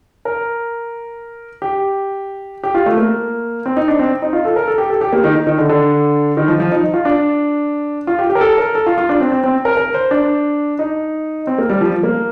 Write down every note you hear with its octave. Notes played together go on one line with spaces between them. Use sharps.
A#4
G4
G4
F4
A3
A#3
C4
D#4
D4
C4
D#4
F4
A4
A#4
A4
G4
A4
G4
A#3
D#3
D#3
D#3
D3
D3
D#3
F3
F3
D#4
F4
D4
F4
G4
G4
A#4
A4
A#4
A4
F4
F4
D4
C4
C4
C4
A#4
A#4
C5
D4
D#4
C4
A#3
G3
F3
A#3